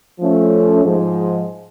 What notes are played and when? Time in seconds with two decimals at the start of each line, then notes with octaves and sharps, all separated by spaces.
0.20 F3 A3 C#4
0.84 G#2 F3 G#3